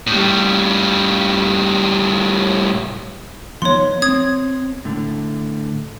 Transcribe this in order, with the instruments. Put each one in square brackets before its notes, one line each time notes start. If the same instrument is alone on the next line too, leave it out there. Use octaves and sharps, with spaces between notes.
[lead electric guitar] A2 G3
[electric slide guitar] F3 B3 D#4 [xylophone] C#5 C6
[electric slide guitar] C4 [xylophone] D#6 G#6
[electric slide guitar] A2 D3